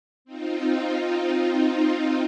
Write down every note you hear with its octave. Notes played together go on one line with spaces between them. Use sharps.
C4 D#4 F4